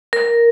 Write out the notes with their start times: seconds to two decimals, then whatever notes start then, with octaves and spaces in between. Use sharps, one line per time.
0.13 A#4